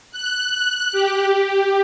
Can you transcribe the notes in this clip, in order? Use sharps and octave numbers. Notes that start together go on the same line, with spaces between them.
F#6
G4